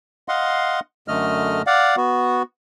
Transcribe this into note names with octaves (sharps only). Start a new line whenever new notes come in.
D#5 F5 F#5 C6
F#2 D3 A3 D#5 F6
D5 F5 F#5
B3 F#4